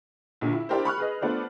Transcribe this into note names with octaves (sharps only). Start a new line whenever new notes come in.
A#1 A#2 D3
E4
D4 E4 G4 A#4 C5
B5 C#6 F6 F#6
G#4 B4 D#5
A3 B3 D4 F4 C5